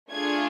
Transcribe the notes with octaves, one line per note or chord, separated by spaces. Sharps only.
A3 D4 F4 G#4 G#6